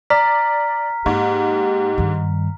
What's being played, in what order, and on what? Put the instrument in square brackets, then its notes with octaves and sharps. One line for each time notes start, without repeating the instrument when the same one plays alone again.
[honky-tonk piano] D5 [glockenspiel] A#5 F6 B6
[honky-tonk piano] G#2 [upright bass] A#3 [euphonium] G4
[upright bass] G2 D#3